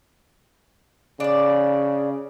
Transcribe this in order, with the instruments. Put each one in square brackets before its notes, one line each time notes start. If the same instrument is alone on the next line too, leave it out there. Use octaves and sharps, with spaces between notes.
[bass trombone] C#3 [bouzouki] D4 D5